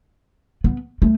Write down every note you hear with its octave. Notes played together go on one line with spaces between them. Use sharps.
B3
A3